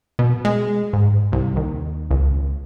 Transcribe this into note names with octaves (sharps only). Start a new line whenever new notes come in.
B2
G#3
G#2
C2
D#2
C#2